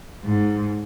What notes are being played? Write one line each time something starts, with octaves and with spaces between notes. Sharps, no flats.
G#2